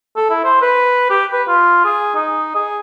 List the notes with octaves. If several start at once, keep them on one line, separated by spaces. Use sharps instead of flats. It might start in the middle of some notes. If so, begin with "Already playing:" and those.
A4
E4
C5
B4
G4
B4
F4
G#4
D#4
G#4